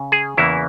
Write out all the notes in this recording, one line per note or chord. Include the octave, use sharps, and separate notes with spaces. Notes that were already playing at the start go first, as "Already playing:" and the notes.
Already playing: C#3 C#4
G#4
E2 C#3 E3 A#3 E4